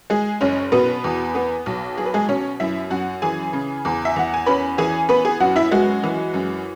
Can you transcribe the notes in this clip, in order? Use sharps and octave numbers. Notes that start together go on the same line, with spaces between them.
G#3 G#4
F#1 C#4 C#5
B2 B3 B4
E2
B3
B1
F#3 G#4
B4
G#3 G#4
B2 C#4 C#5
F#2 E4 E5
F#2 F#4 F#5
E3 G#4 G#5
C#3
E2
E5
E2 F#5
G#5
C#4 B4 B5
E3 G#4 G#5
B3 B4 B5
G#4 G#5
F#2 F#4 F#5
E4 E5
G#3 F#4
E3
F#2